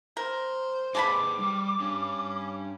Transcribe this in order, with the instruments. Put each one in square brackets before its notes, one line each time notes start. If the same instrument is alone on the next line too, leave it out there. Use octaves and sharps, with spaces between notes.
[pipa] A#4 [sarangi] C5
[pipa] G#3 A5 B5 [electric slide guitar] D#4 G#4 B4 [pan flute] D6
[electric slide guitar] G3 D5
[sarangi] C#4 [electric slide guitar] D4 G4